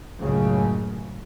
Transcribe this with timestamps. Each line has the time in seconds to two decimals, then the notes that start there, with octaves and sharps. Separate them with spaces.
0.20 C#2 F#2 A2 C#3